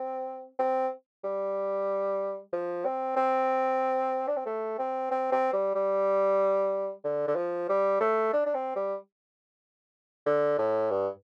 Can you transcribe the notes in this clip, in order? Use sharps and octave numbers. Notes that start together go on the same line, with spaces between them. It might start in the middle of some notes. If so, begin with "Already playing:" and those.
Already playing: C4
C4
G3
F3
C4
C4
D4
C4
A3
C4
C4
C4
G3
G3
D3
D3
F3
G3
A3
D4
D4
C4
G3
D3
A2
G2